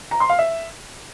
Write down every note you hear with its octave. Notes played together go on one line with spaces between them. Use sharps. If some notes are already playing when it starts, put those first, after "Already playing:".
A#5
C6
F5
E5